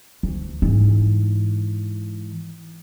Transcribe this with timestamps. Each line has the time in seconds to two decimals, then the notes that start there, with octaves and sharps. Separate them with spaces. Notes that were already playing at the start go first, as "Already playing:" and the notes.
0.23 D2
0.62 G#2 E3